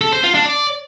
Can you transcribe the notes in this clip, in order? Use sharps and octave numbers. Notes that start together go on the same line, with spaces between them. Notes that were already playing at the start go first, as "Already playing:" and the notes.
A4
C5
F4
D4
D5